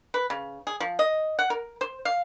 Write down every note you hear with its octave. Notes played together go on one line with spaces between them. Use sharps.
B4
C#3
G#4
F3
D#5
F#5
A#4
C5
F5